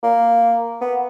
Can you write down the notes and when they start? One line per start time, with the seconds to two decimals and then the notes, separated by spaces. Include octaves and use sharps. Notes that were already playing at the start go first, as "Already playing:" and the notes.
0.03 A#3
0.81 B3